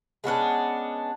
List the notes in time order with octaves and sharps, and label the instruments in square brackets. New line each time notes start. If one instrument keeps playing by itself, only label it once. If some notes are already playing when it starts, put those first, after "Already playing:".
[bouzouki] G#3 B3 C#4 D4